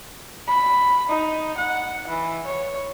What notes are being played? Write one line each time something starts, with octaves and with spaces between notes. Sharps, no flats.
B5
D#4
F#5
E3
C#5